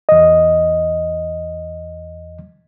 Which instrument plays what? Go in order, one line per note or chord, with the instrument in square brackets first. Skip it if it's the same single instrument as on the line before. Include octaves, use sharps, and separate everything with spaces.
[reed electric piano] E2 D#5